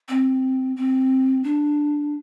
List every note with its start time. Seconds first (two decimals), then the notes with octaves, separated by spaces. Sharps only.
0.09 C4
0.76 C4
1.44 D4